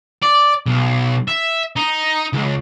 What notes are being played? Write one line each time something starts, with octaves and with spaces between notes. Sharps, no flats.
D5
B1
E5
D#4
C#2